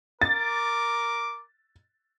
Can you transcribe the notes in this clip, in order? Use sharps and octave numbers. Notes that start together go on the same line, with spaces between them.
A#4 D6 A6